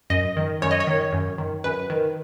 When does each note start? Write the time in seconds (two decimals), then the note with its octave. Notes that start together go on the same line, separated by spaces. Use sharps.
0.10 F#2 D#5
0.37 D#3
0.62 F#2 C#5
0.71 D#5
0.80 C#5
0.87 D#3
1.13 F#2
1.38 D#3
1.64 F#2 B4
1.90 D#3